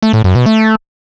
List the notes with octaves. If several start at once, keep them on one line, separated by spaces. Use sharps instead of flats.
A3
A2
F#2
B2
A3